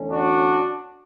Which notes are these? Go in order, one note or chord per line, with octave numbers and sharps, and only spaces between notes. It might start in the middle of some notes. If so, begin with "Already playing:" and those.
Already playing: E2 D3 A3 C#4
D4 F#4